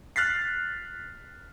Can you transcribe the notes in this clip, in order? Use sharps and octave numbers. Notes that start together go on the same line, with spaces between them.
F6 F#6 A6 B6 C7